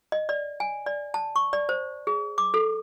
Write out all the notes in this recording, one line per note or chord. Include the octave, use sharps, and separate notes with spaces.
D#5
D5
G#5
D5
A5
C#6
D5
C5
G#4
D6
A4